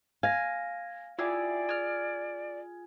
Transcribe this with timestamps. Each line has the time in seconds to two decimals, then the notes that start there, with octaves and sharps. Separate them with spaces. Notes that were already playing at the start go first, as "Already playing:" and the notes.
0.23 F5 G#5 G#6 A#6
1.19 E4 F4 G4 G#4 D5 G#5
1.69 G#4 F6